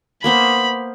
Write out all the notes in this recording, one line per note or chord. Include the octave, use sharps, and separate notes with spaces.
A#3 B3 C5 B5